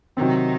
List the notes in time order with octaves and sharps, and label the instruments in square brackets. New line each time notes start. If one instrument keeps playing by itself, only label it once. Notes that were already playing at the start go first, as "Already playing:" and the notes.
[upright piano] C3 F#3 C4 [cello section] D#3